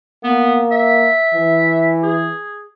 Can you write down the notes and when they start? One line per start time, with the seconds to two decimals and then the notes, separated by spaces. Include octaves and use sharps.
0.24 A#3 B3
0.71 E5
1.34 E3
2.03 G#4